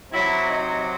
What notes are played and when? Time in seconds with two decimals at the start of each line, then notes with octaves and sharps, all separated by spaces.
0.10 C3 F#3 E4
0.48 D#4